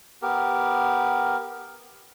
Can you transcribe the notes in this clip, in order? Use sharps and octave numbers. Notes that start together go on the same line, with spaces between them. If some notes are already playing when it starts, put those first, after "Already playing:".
B3 G4 A#4